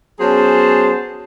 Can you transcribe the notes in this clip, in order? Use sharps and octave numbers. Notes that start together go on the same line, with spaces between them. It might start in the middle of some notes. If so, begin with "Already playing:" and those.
F#3 B3 C#4 G#4 C5 A5